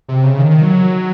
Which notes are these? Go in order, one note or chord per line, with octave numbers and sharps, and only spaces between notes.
C3
C#3
D#3
F#3